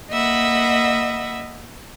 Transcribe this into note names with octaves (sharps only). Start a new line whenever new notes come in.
A#3 D#5 E5 F#5 B5